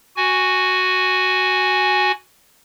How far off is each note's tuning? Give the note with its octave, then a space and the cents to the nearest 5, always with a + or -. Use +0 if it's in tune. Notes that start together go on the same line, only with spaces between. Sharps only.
F#4 +0 G#5 +0